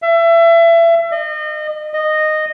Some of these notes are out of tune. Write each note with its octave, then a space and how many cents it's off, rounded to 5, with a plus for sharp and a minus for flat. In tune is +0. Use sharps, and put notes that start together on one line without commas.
E5 +30
D#5 -30
D#5 -10